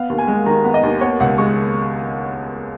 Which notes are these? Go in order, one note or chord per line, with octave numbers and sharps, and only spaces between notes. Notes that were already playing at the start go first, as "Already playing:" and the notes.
Already playing: B3 F5
D#2
G#5
G#3
D#3 A#5
B3
D#5
D#2
B3 C#5
C#2 F#5
G#3 C#6